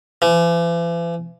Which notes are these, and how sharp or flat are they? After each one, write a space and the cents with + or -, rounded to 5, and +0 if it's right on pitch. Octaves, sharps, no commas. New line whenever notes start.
E3 +45